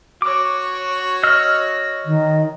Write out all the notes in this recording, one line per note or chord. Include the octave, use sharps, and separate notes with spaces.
F#4 C#5 D6
D#5 E6 F6
D#3